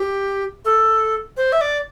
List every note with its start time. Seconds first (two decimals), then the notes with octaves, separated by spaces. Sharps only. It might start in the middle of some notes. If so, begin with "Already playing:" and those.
Already playing: G4
0.65 A4
1.37 C5
1.52 E5
1.61 D5